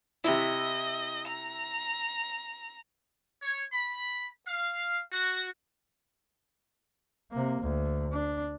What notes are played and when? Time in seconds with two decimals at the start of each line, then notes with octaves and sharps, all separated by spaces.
0.24 C3 E4 D#5
1.27 A#5
3.42 C#5
3.73 B5
4.47 F5
5.13 F#4
7.31 C3 A#3
7.62 D2
8.12 D4